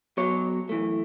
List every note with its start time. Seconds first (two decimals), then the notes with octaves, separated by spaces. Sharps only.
0.17 B1 B2 F#3 C#5
0.69 F#2 E3 A3